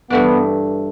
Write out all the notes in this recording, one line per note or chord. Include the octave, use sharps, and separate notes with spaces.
G2 E3 A3 B3 D4